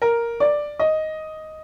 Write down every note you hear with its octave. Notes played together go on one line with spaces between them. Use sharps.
A#4
D5
D#5